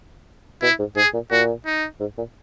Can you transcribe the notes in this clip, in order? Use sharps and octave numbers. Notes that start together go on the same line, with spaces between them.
B2 E4
G#2
G#2 G#4
A#2
A#2 F#4
D#4
G#2
A#2